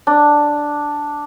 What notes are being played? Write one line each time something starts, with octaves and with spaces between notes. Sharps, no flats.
D4